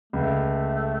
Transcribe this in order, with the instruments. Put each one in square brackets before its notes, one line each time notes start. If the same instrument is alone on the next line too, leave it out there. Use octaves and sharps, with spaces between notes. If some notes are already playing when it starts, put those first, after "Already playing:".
[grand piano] C#2 [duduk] A3